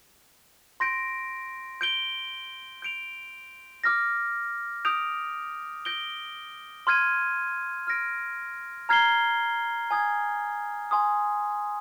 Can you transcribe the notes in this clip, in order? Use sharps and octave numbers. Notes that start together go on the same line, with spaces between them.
C6 G6 A#6 D7
G6 D7 G7
G6 D7 F7
D6 F6 A#6
D#6 G6 D7 F7
G6 A#6 D7 G7
C6 F6 G#6 D#7
F6 A#6 D7
A#5 F6 G#6 C7 G7
G#5 D#6 G#6
G#5 C6 D#6